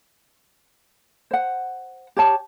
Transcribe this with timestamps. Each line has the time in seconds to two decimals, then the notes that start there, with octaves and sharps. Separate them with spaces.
1.31 C5 F#5
2.17 G4 C#5 A5